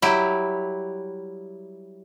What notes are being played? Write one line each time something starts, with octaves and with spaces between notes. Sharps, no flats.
F#3 G3 E4 G4